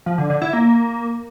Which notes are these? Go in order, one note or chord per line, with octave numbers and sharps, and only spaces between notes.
F3
D3
D3
E4
A#3